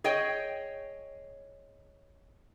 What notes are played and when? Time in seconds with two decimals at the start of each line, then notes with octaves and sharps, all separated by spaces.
0.04 G#4 C#5 D#5 G5